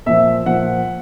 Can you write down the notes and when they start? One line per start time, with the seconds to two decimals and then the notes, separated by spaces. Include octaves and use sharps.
0.06 A#2 F3 E5
0.46 A#2 F3 F#5